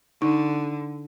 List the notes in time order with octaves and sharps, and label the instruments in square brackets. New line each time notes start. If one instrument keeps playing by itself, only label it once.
[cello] D3 [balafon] D#4